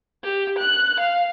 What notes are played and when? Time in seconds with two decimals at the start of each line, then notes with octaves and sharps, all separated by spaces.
0.24 G4
0.58 F#6
1.00 F5